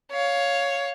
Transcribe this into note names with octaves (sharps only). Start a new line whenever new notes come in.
C#5 F5